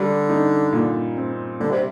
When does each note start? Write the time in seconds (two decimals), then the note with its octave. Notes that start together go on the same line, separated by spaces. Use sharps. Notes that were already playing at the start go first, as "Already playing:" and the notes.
Already playing: D3 G3
0.29 D#4
0.72 A#2
1.17 C4
1.60 D3 G3
1.70 C3